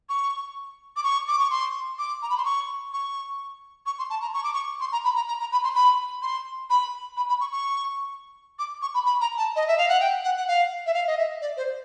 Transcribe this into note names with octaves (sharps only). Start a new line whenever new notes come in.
C#6
D6
C#6
D6
C#6
C6
D6
A#5
B5
C6
C#6
C#6
C#6
C6
A5
A#5
C#6
D6
C#6
C6
A#5
B5
A#5
A#5
A#5
B5
C6
B5
C6
B5
B5
B5
C#6
C#6
D6
C#6
B5
B5
A#5
A5
D#5
E5
F5
F#5
G5
F#5
F#5
F5
E5
F5
D#5
E5
D5
C5